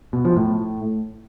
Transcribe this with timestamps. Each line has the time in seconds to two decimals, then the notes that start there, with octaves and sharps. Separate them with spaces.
0.13 B2
0.25 F3
0.37 A2